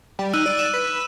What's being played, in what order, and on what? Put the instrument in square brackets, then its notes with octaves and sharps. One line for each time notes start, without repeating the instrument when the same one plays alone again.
[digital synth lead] G3
[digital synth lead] D#4 [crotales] E6 F#6 D#7
[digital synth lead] D5
[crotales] E7
[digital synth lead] B4